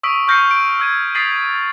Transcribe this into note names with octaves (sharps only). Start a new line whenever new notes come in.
C#6 D#6 E6 B6 D7
C#6 F6 G6 A#6 C7 C#7
D7
E6 G#6 D#7
D#6 A6 B6 C7 D#7 F#7